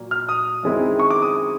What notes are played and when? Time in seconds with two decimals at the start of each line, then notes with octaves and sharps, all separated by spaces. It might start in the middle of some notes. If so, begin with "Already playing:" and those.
Already playing: A#2 F#3 A#3
0.11 F6
0.29 D#6
0.63 F#2 D#3 G#3 C4 E4
0.99 C#6
1.10 D6
1.22 D#6